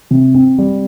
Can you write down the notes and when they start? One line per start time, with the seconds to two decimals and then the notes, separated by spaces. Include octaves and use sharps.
0.11 C3
0.34 C4
0.58 G3